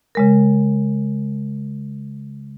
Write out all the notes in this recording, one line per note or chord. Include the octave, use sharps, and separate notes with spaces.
C#3 G#3 A#4